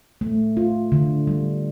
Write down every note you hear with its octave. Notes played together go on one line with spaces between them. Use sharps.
A3
F4
D3
G3